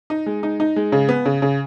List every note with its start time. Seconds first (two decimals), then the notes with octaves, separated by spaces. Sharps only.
0.10 D#4
0.26 G#3
0.43 D#4
0.60 D#4
0.76 G#3
0.92 C#3
1.09 B3
1.26 C#3
1.42 C#3